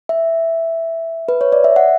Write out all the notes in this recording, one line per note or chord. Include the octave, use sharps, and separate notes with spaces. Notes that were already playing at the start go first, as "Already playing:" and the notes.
E5
B4
C#5
D5
E5
F#5